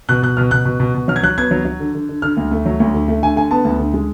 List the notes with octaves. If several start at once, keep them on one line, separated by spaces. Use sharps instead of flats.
B2 F#6
B2 F#6
B2 F6
B2 F#6
B2
B2
B2
F#3 F6
G#6
F#3 F#6
B3 G#6
F#3
F#3
D3
D3
D3
D3 F6
D2
A3
F#3
D2
D3
A3
D3 G#5
D3 G#5
B3 A5
D2
D3
G#3